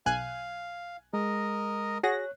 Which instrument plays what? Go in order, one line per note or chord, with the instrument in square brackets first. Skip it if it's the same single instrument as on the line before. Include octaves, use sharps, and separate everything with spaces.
[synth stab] B1 G#5 F#6 [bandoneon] F5
[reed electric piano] G#3 [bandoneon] A#4 D#5
[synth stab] F#4 G#4 A#6 [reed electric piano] C#5 F#6